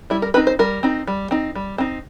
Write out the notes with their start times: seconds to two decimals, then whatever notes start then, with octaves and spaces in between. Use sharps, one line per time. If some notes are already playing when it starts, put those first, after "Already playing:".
0.10 G3 E4
0.22 A#4
0.34 C4 D#4 B4
0.47 C5
0.59 G3 A#4
0.83 C4 D#4
1.07 G3
1.31 C4 D#4
1.55 G3
1.78 C4 D#4